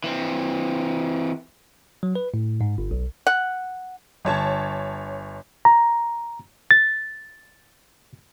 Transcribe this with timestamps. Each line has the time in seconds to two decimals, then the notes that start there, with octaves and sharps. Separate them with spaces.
0.04 E3 C4
2.03 F#3
2.15 B4
2.34 A2
2.61 G#2
2.78 G1
2.91 B1
3.27 F#5
4.25 G1 C#5 A5 G#6
5.65 A#5
6.71 A6